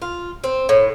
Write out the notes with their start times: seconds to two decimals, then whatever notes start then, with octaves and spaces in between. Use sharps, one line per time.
0.02 F4
0.44 C4
0.69 A2